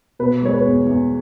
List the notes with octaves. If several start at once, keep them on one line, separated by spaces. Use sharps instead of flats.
B2 B4
G#3 C#5
B4
E2
E2